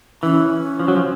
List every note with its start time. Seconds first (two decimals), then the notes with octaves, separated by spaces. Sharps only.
0.23 E3 C#4
0.79 F3
0.88 F#3
0.96 F3